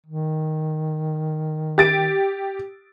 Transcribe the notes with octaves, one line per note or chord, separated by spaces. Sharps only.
D#3
G4 A6 D7